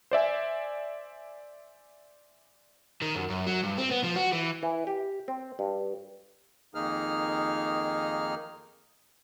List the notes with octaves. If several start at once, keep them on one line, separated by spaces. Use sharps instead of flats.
C5 D5 E5 G#5
D#3
F#2
F#2
F#3
G2
C4
B3
F3
F#4
E3
E3
G4
C4
G2
F2 D#3 A#3 D#4 G#4 F6